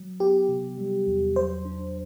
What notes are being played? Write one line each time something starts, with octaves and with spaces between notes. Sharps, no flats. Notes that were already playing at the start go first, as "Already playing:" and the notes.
Already playing: F#3
B3 G4
C3
G3
E2
F#3 C5
D4